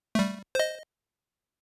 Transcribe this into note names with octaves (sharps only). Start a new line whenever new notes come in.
G3 A3
C5 D#5